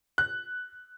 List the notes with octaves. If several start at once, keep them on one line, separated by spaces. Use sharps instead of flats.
F#6